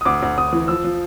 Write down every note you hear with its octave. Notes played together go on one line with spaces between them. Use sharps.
D#6
D2 D6
D2
D2 D#6
E3
F3 E6
F3